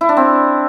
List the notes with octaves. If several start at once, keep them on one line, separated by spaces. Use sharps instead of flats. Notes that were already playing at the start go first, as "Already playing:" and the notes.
E4
D4
C4